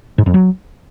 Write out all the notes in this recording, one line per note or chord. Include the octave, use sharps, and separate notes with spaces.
G#2
F2
F#3